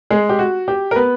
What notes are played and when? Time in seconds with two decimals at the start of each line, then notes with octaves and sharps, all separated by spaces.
0.10 G#3 G#4
0.29 G4
0.39 F#4
0.68 G4
0.91 A#4
0.96 B3 B4